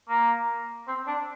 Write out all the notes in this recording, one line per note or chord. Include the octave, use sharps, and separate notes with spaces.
A#3
C4
D4